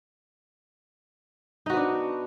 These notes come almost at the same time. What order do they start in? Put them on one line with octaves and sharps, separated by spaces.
D#4 F#4 B3 D4